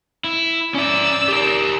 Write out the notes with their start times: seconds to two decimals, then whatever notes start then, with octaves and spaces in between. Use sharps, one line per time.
0.24 E4
0.74 C#4 D5 E5 E6
1.28 G4 A#4